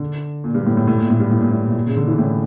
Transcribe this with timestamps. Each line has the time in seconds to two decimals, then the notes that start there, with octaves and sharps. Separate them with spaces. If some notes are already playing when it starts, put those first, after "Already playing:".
Already playing: D3
0.44 A#2
0.54 G2
0.66 A2
0.77 A2
0.87 A2
0.98 A#2
1.10 A2
1.20 G2
1.31 A2
1.41 A#2
1.51 A2
1.70 A2
1.75 A#2
1.86 C#3
1.97 D3
2.08 E3
2.18 A2